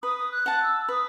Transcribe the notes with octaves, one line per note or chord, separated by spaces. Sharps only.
B4 D#6
F#6
F#5 A5
E6
B4 D#6